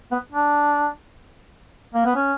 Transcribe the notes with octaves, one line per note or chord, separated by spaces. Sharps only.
B3
D4
A#3
B3
C#4